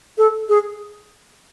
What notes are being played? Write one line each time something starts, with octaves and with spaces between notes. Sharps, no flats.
A4
G#4